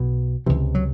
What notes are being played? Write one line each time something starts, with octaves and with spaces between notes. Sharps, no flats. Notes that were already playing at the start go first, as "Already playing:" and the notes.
Already playing: B1 B2
C#2 C3 E3
F#3